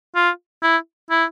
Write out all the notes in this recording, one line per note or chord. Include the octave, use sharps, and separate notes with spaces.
F4
E4
E4